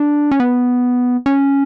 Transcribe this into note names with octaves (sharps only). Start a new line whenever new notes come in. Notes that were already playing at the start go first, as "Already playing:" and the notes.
Already playing: D4
C#4
B3
C#4